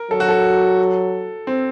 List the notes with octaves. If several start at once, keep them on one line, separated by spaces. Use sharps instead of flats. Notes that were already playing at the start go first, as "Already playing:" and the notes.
Already playing: A#4
F#3 A4
F#4
A4
C4